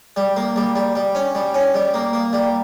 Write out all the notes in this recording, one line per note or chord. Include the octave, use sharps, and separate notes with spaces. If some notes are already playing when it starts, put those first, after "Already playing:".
G3
A#3
G3
G3
G3
C#4
G3
C#4
G3
A#3
A#3
G3